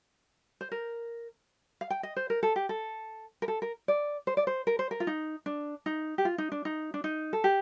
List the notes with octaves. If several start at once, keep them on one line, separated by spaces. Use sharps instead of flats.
C5
A#4
F5
G5
D#5
C5
A#4
A4
G4
A4
A#4
A4
A#4
D5
C5
D5
C5
A#4
C5
A#4
F4
D#4
D4
D#4
G4
F4
D#4
D4
D#4
D4
D#4
A4
G4